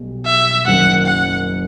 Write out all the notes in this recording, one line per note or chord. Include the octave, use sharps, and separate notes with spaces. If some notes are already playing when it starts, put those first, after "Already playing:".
Already playing: B1 B2 G3
E5
F#1 F#2 D#3 F#5
F#5